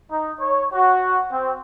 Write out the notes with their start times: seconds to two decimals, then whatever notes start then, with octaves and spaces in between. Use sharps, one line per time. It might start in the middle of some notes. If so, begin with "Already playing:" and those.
0.10 D#4
0.40 C#5
0.73 F#4
1.32 C4